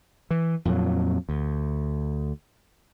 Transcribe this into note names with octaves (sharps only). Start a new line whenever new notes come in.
E3
F2 A#2 F#3
D2